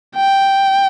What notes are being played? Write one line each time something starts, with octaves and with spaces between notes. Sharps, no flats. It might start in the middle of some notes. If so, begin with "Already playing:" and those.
G5